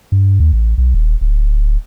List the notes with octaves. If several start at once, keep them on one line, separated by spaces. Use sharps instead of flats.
G2
D#2
A1
B1
D#1
D1